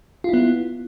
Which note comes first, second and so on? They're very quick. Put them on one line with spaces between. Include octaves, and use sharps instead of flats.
F4 E4 B3